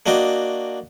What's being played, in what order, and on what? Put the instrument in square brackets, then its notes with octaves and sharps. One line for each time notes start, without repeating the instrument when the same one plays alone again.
[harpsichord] A#3 D4 F#4 D#5 G5